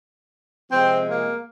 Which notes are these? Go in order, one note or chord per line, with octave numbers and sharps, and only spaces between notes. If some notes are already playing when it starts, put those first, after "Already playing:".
C3 F3 G#3 C4
A#3